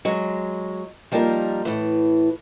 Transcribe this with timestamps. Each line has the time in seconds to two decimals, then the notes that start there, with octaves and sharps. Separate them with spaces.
0.05 F#3 G#3
1.12 F3 G3 A#3 D#4 A#4
1.65 A2 E3